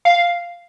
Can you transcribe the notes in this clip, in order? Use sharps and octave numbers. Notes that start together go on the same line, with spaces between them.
F5